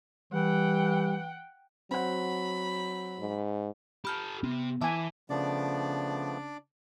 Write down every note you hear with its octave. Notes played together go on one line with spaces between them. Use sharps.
E3 G3 F#5 G5
F#3 C4 F#5 B5
G#2
G4 A4 B5 F6 G6
C3 B3
E3 E5 G#5 A5 D6
C#3 F3 A3 B3 D4 D5